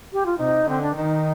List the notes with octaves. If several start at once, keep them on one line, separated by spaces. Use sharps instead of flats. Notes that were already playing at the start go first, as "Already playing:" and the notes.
G4
F4
C3 D#4
D3 C4
D4
D#3 D#4